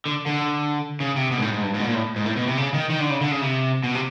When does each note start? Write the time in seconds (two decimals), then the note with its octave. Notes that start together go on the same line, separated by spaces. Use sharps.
0.06 D3
0.26 D3
1.00 C#3
1.16 C3
1.32 B2
1.38 G#2
1.42 A2
1.52 G#2
1.63 G2
1.74 G#2
1.79 B2
1.84 A#2
1.94 A2
2.16 G#2
2.26 A2
2.37 B2
2.47 C3
2.58 C#3
2.74 D#3
2.90 D#3
3.00 D3
3.10 C#3
3.21 D3
3.31 C#3
3.41 C3
3.84 B2
3.95 C3